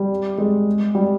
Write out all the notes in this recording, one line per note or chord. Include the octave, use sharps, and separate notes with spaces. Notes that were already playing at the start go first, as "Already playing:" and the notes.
Already playing: G3
G#3
G3